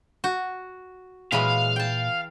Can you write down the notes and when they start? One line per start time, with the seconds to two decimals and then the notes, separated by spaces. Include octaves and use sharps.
0.24 F#4
1.32 A#2 E3 F#3 G#3 F5 B5
1.76 G5 A5